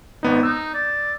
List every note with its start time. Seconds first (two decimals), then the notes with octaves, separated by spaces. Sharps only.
0.23 G#1 B3 D#4
0.43 D#4 E6
0.74 D5